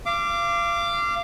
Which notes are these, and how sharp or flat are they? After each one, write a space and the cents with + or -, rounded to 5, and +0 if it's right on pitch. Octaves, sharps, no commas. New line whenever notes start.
F5 -30 D6 +0